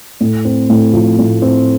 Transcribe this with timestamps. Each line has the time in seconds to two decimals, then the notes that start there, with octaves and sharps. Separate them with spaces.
0.20 A2
0.45 C4
0.70 A2
0.93 F3
1.19 A2
1.42 C4